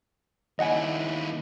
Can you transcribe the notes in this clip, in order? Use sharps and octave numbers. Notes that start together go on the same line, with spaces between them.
D#2 E4 D#5 F#5 G#5